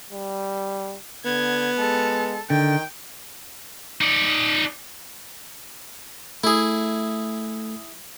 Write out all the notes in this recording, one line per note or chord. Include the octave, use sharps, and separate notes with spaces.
G3
D3 B3 G#6
G#3 A4
D3 D#3 G5
D#4 D5
A3 E4 G#4